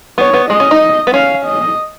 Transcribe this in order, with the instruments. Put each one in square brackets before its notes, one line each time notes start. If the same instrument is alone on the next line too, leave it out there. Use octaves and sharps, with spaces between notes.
[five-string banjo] B3 [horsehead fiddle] C#5
[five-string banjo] B3
[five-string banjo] G#3 [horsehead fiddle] D#5
[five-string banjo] C#4
D#4
B3
[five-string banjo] C#4 [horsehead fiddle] F5
[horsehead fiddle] D#5